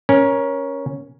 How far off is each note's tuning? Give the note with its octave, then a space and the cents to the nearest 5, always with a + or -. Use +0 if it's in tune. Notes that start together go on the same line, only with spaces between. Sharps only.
C#4 +0 A#4 +20